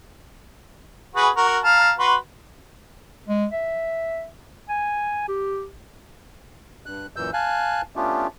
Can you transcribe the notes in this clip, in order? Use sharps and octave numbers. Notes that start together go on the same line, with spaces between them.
F#4 G#4 B4
F#4 A#4
F5 A5 A#5
F#4 B4 C6
G#3
E5
G#5
G4
G2 F#6
F#2 A#2 E3 E6 G6
F5 G#5 A5 F#6
A3 B3 C#4 D4 F4 G4